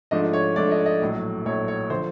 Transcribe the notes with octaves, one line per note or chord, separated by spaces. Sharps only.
G#2 F3 A3 D4 D#5
C#5
G#2 F3 A3 D4 D5
D#5
D#5
A#1 A2 F#3
A#1 A2 F#3 C#5
C#5
D3 F3 C5